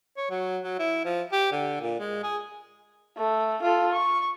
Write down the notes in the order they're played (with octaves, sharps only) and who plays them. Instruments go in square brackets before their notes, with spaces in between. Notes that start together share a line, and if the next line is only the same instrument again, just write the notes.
[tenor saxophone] C#5
F#3
F#3
E4
F3
G4
D3
A#2
G#3
G#4
[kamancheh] A3
F4 A4
C#6